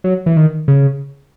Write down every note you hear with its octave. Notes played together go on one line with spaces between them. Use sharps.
F#3
E3
D#3
C#3